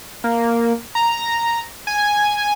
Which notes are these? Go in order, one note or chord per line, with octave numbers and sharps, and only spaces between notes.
A#3
A#5
G#5